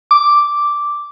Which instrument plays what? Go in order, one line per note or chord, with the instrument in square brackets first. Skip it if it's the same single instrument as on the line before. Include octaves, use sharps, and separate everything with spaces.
[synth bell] D6